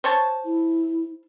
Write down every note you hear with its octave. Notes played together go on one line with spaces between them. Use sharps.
C5 C#5 A5
E4